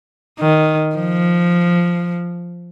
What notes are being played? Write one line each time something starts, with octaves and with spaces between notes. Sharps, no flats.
D#3
F3